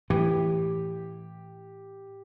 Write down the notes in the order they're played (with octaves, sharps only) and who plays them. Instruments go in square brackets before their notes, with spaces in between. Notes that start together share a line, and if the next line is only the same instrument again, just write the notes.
[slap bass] A2 E3 [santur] G4